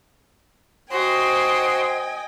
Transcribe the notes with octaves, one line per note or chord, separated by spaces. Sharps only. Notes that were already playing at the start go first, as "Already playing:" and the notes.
F#4 C5 D#5 G5 G#5 C6